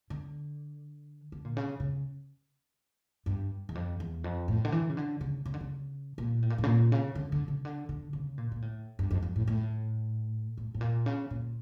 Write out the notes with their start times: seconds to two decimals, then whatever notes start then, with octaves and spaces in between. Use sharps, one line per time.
0.10 D3
1.32 D3
1.45 A#2
1.57 C#3
1.80 C#3
3.26 G2
3.69 E2
3.75 F2
4.00 E2
4.24 F2
4.48 A2
4.65 D3
4.72 E3
4.90 C#3
4.97 D3
5.21 C#3
5.46 C#3
5.54 D3
5.61 C#3
6.18 A#2
6.42 A2
6.50 A#2
6.58 A2
6.63 C#3
6.67 A#2
6.92 C#3
7.15 D3
7.32 D3
7.48 C#3
7.65 D3
7.89 D3
8.13 C#3
8.38 A#2
8.52 A#2
8.62 A2
8.99 G2
9.11 F2
9.23 F2
9.36 A2
9.48 A2
10.57 A2
10.74 A2
10.81 A#2
11.06 C#3
11.31 A#2